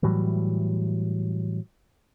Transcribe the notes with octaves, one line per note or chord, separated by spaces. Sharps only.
A2 E3 F#3 G3